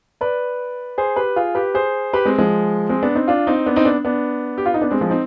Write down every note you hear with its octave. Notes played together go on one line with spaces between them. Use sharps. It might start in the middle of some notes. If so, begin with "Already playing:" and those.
B4 D5
G#4 C5
G4 B4
F4 G#4
G4 B4
G#4 C5
G4 B4
G#3 C4
F3 G#3
G#3 C4
B3 D4
C4 D#4
D4 F4
C4 D#4
B3 D4
C4 D#4
B3 D4
B3 D4
G4
F4
D#4
B3 D4
G#3 C4
F3 G#3
C4 D#4